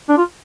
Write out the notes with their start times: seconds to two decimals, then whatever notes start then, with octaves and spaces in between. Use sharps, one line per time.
0.09 D4
0.17 F4